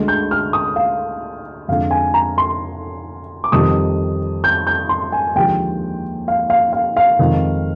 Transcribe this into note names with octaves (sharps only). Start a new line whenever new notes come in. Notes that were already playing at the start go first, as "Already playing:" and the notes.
Already playing: D2 D3 G#3
G6
F6
D#6
F5
F2 D3 G#3 F5
G#5
A#5
C6
D6
F2 D#3 G3 D#6
G6
G6
C6
G#5
D#2 D3 F3 G#3 G5
F5
F5
F5
F5
F2 D#3 G#3